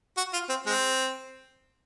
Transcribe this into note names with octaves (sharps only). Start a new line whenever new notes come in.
F#4
F4
C4
G#3 C4